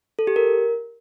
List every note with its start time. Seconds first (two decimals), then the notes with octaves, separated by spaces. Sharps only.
0.19 A4
0.27 G4
0.36 A#4